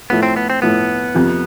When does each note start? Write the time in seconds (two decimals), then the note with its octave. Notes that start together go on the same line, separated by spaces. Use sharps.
0.10 A2 F3 A3 B3
0.23 C4
0.36 B3
0.50 C4
0.62 A2 F3 A3 B3
1.14 F2 C3 F3